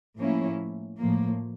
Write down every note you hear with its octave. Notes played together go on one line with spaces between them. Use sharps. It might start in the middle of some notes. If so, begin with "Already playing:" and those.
A2 F3 A#3 C#4 E4
A2 F3 A#3